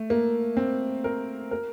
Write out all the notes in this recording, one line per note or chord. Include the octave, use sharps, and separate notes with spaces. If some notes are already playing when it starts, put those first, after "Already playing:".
Already playing: A3
A#3
C4
A#4
A#4